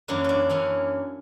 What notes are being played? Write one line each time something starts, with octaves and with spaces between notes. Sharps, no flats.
F#2 E3 A#3 C#4 D4
C#4 D4
F#2 E3 A#3 C#4